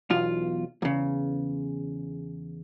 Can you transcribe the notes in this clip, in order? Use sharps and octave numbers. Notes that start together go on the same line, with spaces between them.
B1 E2 F4
E2 C#3